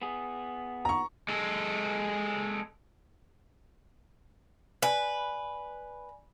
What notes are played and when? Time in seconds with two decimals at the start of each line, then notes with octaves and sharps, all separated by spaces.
0.02 B3 G#4
0.85 A#5 C#6
1.29 G#3 A4
4.82 B4 D5 G#5